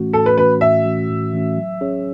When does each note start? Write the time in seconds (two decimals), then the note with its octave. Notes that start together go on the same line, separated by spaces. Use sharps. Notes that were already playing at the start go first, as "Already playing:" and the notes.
Already playing: A2 E3 A3 C#4 F#4
0.13 A2 A4
0.26 B4
0.37 E3 A3 C#4 F#4 B4
0.61 A2 E5
0.85 E3 A3 C#4 F#4
1.10 A2
1.34 E3 A3 C#4 F#4
1.57 F#3
1.81 C#4 G#4 C#5